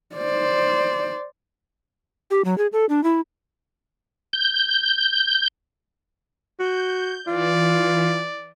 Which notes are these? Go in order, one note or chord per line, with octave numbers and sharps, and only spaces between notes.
C5 D5
G4
F#3
G#4
A4
D4
E4
G6
F#4 G6
E3 F4 D5